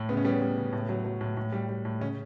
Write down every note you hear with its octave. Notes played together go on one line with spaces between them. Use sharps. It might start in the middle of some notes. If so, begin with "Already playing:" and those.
Already playing: A2
C#3 B3
C#4
G3 B3
G3
C#3
A2
F#3
F#3
A2
A2
G3
G3
A2
C#3 C#4